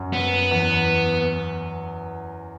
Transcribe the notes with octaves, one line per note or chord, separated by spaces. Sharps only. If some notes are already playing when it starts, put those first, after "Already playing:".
Already playing: F#2
B3
E2